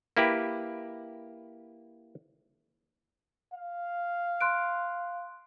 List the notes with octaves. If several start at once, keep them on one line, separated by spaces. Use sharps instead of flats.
A#3 E4 G4 B4
F5
C6 F#6 D7